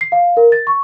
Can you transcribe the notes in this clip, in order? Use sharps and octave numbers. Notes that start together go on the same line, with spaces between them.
C7
F5
A#4
A6
C#6